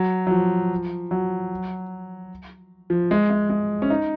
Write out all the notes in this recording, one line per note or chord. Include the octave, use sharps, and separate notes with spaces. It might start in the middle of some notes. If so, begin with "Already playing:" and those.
Already playing: F#3
F#3
F3
F#3
F3
G#3
G#3
G#3
C#4
D#4